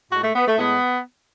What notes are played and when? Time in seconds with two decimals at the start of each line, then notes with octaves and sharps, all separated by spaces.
0.11 A2 G#3 F#4
0.23 A3
0.34 B3
0.46 A3
0.58 A2 G#3 B3